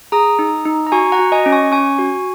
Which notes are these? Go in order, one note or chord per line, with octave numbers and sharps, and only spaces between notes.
G#4 A#5 D#6
D#4
D#4
A#5
F#4 G#5 C#6
F#5 A#5
F#4
D#5 G#5
C#4
G#5 C#6
C#4 G#5 C#6
F#4